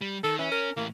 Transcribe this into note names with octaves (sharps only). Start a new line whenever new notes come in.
G3
D#3 A4
E3 C#4
A#4
A2 E3 A#3